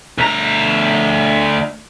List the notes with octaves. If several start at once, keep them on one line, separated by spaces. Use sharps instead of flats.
D2 A#5